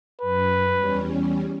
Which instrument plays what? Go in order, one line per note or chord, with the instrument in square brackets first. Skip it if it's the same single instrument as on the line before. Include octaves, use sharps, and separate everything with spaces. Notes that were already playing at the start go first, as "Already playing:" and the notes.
[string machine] F#2 [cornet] B4
[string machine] E2 G3 C#4